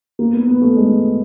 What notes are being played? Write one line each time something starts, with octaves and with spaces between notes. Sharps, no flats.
A#3
B3
B3
A3
G#3